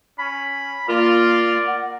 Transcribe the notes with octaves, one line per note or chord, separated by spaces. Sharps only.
C#4 B5
A#3 F4 A#4 D5
F#5